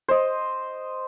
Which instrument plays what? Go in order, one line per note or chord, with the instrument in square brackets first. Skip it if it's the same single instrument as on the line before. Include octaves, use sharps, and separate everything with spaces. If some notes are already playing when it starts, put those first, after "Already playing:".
[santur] C5 D#5